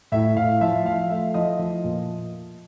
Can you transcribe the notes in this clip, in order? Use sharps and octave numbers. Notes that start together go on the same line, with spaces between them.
A2 E5
A2 F5
F3 E5
F3 F5
A3 E5
F3 D#5
F3
A#2